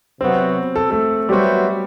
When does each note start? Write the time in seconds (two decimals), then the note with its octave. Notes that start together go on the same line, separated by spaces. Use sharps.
0.21 C3 F#3 B3 C4 F#4
0.76 A4
0.90 A3 A4
1.29 F#3 G3 B3 F#4 G4 C5 E5